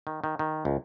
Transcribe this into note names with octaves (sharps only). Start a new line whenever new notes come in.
D#3
D#3
D#3
C#2